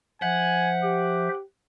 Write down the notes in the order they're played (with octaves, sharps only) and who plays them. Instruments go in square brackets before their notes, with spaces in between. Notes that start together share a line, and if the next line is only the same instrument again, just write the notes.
[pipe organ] F3 C5 E5 [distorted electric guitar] F#5 [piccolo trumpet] G#5
[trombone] G4 [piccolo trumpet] D6